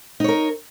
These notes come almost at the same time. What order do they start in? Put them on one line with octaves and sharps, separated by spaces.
D#4 C#5 A#4